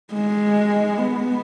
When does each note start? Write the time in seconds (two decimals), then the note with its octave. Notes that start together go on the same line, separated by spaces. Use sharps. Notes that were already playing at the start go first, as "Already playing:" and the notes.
0.13 G#3
0.98 B3